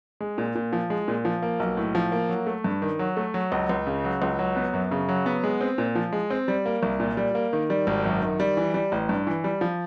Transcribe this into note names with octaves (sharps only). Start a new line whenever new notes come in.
G#3
A#2
A#2
F3
G#3
A#2
F3
A#3
B1
A2
F3
A#3
F#3
A3
G2
D#3
F#3
A3
F#3
C#2
C#2
C#3
F#3
C#2
F#3
B3
F#2
C#3
F#3
B3
G#3
C4
A#2
F3
G#3
C4
G3
A#3
C2
A#2
G3
A#3
D#3
G3
G#1
F#2
D#3
G3
E3
G3
A1
G2
E3
G3
F3